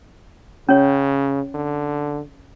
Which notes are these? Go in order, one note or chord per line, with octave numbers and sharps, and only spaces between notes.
C#3 C#4 C#5
D3